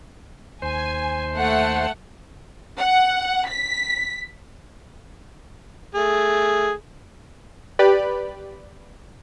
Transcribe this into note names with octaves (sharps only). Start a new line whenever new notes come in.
D#2 C5 G#5
A3 F#5
F#5
B6
A3 G#4
G4 B4 D5 B5